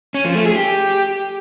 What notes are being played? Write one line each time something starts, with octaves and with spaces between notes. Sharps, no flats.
C#4
F3
A3
G#4
G4